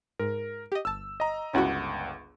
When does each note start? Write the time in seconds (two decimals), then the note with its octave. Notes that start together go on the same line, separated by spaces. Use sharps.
0.19 G#2 A#4
0.72 G4 D#5
0.85 G1 A5 E6
1.20 D#5 A#5
1.53 G1 C#2 C#4 E4 F#4 F#5